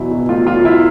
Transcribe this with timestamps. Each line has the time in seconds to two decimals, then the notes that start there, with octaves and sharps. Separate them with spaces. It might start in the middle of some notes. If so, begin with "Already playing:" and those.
Already playing: E2 B2 F#3 E4
0.11 B2
0.29 A3 F4
0.46 E2 F4
0.64 F#3 E4